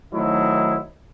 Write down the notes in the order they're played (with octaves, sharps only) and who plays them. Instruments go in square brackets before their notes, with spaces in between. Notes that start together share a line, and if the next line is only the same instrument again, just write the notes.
[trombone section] D#3 F#3 A3 C4 D#4 E4